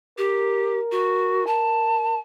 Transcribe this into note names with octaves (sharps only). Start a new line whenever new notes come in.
G4 A#4
F#4
A5